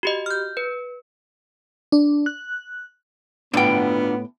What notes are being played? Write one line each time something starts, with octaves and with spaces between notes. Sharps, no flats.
F#4 G4 D#5
F6 G6
B4
D4
F#6
A2 B3 D4 F4 F#5 G5